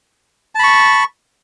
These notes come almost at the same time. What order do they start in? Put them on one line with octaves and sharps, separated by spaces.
A5 B5 C#6